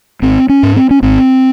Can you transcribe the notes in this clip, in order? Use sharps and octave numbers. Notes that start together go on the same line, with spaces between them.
G#1 C4
C#4
G#2
C4
C#4
G#1 C4